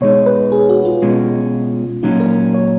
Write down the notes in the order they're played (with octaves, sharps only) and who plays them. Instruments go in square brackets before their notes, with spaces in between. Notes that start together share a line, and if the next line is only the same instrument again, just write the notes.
[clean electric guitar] B2 G#3 D#4 [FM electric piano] C#5
[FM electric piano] B4
G#4
F#4
F4
[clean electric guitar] B2 G#3 C#4
[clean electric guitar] A#2 F#3 C#4 [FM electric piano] D#4
[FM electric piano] A#4
C#5